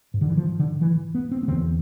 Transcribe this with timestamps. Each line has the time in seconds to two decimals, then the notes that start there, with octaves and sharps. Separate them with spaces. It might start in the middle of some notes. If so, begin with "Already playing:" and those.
0.14 G#2
0.21 D3
0.28 E3
0.37 F3
0.59 D3
0.81 E3
1.15 B3
1.31 C4
1.43 B3
1.48 E2 D3 C4